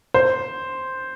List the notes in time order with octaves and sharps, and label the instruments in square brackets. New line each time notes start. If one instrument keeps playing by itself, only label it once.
[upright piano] C5